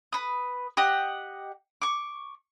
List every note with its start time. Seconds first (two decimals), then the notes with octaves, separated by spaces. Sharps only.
0.12 B4 D#6
0.77 G4 D#5 F#5
1.82 C#6 D6